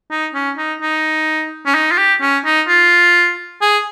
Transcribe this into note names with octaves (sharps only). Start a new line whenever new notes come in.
D#4
C#4
D#4
D#4
C#4
D#4
F4
G4
C#4
D#4
F4
G#4